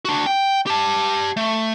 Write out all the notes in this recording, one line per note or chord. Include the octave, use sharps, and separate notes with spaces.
D4 F#4
G5
G4 A5
A3